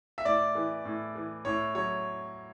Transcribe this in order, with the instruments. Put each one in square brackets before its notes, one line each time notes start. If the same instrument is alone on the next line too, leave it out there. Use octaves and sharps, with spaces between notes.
[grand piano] E5
A2 D5
E3
A2
E3
A2 C#5
F#3 C#5